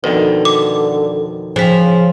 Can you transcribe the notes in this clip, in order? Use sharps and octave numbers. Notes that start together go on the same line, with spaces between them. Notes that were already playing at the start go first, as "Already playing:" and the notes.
F2 B2 D3 D#3 B4
D6
C#3 F3 C5 B6